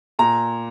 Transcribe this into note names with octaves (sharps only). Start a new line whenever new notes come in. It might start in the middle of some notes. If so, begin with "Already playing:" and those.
A#2 A#5